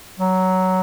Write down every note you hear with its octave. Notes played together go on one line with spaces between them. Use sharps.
F#3